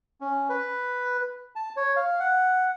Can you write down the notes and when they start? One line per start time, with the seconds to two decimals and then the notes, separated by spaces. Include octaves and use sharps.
0.21 C#4
0.49 B4
1.56 A5
1.77 C#5
1.96 F5
2.20 F#5